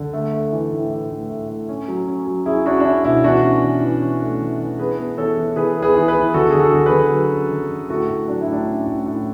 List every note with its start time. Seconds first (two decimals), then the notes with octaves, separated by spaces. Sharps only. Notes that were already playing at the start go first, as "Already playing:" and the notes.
Already playing: D3
0.13 A3
0.33 A3
0.53 E3
0.72 A2
0.92 E3
1.10 A2
1.30 A3
1.49 A3
1.69 C#4
1.88 F#3
2.07 C#4
2.27 F#3
2.46 C#4 E4 G#4
2.66 C#4 D4 F#4
2.80 D4
2.85 C#4 E4
3.04 B2 E4
3.24 E3 D4 F#4
3.44 C#4
3.63 E3
3.82 E3
4.02 C#4
4.21 A3
4.41 E3
4.60 E3
4.79 B3 G#4 B4
4.99 B3
5.18 E3 A4 C#5
5.37 E3
5.56 E3 G#4 B4
5.77 B3
5.82 G#4 B4
5.95 E3
6.08 G#4 B4
6.15 E3
6.34 D3 F#4 A4
6.51 D3 G#4
6.60 F#4 A4
6.73 D3
6.86 G#4 B4
6.92 D3
7.11 F#3
7.31 C#4
7.50 D3
7.70 D3
7.90 A2 F#4 A4
8.09 A2
8.28 F#3 D4
8.41 E4
8.48 A2 D4
8.67 C#4
8.87 A2
9.06 A2